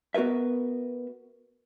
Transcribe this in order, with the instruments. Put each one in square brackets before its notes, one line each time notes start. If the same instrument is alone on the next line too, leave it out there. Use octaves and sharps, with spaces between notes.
[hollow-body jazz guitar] B3 F#4 A#4 B4 E5